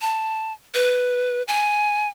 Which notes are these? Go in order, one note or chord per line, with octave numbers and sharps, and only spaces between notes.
A5
B4
G#5